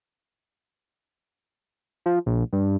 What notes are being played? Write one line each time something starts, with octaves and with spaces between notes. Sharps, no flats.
F3
A#1
G2